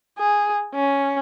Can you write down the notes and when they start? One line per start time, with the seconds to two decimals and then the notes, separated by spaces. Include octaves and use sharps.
0.18 G#4
0.75 C#4